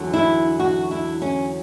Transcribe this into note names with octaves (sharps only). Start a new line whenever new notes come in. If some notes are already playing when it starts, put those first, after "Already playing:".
Already playing: E2 D3 F#3
E4
F#4
E4
C#4